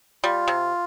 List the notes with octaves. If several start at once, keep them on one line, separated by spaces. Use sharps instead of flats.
G3 F4
C3